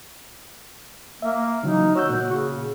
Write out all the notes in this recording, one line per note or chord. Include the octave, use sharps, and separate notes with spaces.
A#3 E5
C#3 E3 F#3 D#4
F#4 C#5 E6 G6
A#2 A#3
C#3